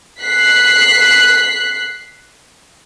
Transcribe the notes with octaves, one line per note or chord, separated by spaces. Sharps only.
F#6 B6 C7